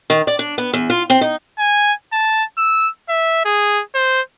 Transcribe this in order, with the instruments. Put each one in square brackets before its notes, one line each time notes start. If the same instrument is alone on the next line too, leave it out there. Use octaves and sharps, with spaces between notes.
[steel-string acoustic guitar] D#3
D5
D4
B3
E2
F4
C4
D#4
[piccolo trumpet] G#5
A5
E6
E5
G#4
C5